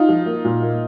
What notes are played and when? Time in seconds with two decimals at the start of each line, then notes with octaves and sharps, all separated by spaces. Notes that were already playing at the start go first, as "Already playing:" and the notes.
Already playing: D#4 F4
0.09 F3
0.26 A#3
0.44 A#2
0.62 A#3